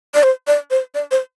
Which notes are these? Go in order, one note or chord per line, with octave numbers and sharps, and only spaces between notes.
D5
C5
D5
C5
D5
C5